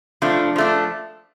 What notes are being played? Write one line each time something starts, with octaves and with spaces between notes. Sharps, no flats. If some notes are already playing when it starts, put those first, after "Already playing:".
F3 A3 D4
F3 A3 D4